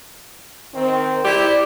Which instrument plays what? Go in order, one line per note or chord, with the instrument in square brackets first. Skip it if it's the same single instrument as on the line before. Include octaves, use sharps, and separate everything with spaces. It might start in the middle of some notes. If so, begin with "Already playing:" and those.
[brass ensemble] D#3 C4
[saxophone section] E4 G4 [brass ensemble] D5